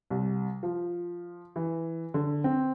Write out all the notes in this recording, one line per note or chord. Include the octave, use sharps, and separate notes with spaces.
C2
F3
E3
D3
C4